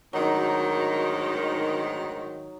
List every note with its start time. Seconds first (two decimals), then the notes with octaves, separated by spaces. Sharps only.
0.13 D2 G#2 D#3 F#3 D#4